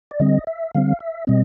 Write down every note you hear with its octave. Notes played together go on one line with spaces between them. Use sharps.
D5
D3 G3 C4 D#5
E5
D3 G3 C4 F5
E5
B2 G3 C4 D#5